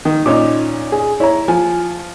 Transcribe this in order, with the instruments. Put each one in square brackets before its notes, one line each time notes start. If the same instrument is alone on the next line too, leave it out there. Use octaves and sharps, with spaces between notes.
[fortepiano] D#3
[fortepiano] A#2 C#4 D#4 [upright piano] D6
[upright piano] G#4
[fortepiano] E4 [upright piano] C#5 A#5
[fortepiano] F3 [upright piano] G#5